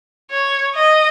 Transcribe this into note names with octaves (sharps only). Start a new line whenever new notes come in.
C#5
D#5